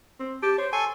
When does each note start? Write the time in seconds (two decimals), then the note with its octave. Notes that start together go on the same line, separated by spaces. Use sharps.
0.20 C4
0.42 G4 A5
0.58 C5 C#5
0.73 A4 G#5 C6 C#6